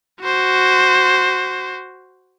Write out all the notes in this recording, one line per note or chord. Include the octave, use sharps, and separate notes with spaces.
F#4 C5